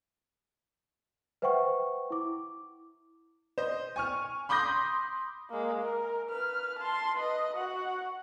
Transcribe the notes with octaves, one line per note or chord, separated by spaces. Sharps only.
B4 C5 E5 F#5 G5 C#6
E4 D6
C5 D#5
G#5 C#6 F6
B5 C6 D6 D#6 G6 A#6
G#3 A#3
A#4
B4 F6
A5 C6
B4 D#5
F#4 F#5